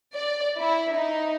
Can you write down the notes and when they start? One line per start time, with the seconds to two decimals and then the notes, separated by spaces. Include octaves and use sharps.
0.13 D5
0.58 E4
0.95 D#4